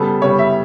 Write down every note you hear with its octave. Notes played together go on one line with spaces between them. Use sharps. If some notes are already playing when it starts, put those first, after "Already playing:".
Already playing: C#3 G3 B3 A4
C#3 G3 B3 C#5
E5